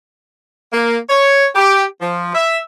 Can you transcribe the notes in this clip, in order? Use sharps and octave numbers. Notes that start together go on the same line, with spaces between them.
A#3
C#5
G4
F3
E5